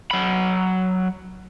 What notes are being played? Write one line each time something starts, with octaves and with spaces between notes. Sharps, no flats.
F#3 B5